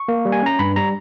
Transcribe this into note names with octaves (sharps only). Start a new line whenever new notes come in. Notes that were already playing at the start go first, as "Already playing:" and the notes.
Already playing: C#6
A#3
G3
G#5
C#4 A#5
G2 B5
G3 A#5